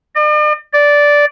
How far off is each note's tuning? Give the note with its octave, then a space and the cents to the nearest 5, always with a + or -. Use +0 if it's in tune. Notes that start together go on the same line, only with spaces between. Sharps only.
D5 +45
D5 -10